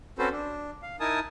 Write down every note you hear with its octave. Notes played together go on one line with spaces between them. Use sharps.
C4 C#4 F#4 A4 B4 C5
D4
F5
D#4 E4 A#4 G#5 A5 D#6